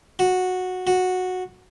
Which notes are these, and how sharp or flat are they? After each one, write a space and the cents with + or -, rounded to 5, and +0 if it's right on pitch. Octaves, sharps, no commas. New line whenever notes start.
F#4 -10
F#4 -10